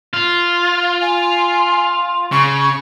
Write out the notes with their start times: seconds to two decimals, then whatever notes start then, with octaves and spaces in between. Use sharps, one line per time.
0.14 F4
1.02 G#5
2.32 C#3 C#6